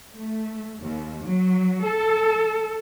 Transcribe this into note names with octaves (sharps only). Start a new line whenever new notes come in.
A3
D#2
F#3
A4